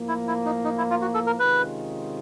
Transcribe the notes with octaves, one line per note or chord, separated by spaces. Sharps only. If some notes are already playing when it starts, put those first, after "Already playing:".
Already playing: A2 F3 A#3
E4
E4
D#4
D#4
E4
F4
F#4
A4
A#4
C3 D#3 G#3 C#4 F4 B4